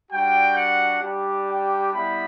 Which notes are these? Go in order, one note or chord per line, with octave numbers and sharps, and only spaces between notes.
G3 D4 F#4 G5
F#5
G3 D4 G4
G5
G3 B3 E4 B5